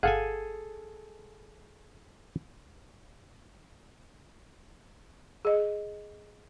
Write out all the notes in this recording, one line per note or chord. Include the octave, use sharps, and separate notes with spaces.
G1 G#4 A4 F5 F#5 G#5
G#4 D#5